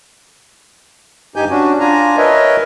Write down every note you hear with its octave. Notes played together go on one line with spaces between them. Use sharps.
G2 D#4 G4 G#5 G6
C#4 D4 F#4
D4 F4 G#5 A#5
A#4 B4 C#5 D#5 E5